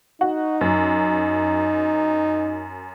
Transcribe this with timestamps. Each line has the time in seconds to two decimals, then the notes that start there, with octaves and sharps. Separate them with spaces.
0.21 D#4 F#4
0.61 F#2